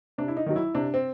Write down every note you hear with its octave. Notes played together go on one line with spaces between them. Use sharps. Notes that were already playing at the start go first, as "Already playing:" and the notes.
C3 D4
E4
D#4
D#3 F#3
E4
C3 D4
C4